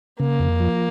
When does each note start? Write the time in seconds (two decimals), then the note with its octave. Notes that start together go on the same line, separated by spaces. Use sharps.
0.20 C#3 A#3
0.39 F2
0.60 F3